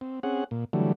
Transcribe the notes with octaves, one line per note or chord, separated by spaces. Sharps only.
C4
C4 C#4 G#4 F#5
A#2
D3 E3 F#3 G3 A3